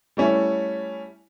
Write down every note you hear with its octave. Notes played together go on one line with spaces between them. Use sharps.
G3 A3 C#4 E4